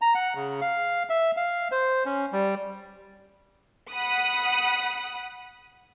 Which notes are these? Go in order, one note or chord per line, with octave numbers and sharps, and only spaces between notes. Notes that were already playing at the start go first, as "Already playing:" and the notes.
A#5
F#5
C#3
F5
E5
F5
C5
C#4
G3
F#5 B5 D#6 F#6